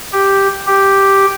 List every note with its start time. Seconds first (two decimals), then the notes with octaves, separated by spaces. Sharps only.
0.13 G4
0.67 G4